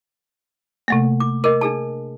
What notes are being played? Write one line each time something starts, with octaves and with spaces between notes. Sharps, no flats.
C3 A3 A#3
D6
A#4 D#5 D6
D4 G#4 A5